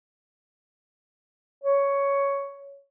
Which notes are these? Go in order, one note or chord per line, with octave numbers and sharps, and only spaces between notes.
C#5